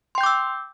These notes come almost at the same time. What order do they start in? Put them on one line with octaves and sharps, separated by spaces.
C6 G5 G6 D6 E6